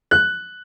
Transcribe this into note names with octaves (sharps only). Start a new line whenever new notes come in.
F#6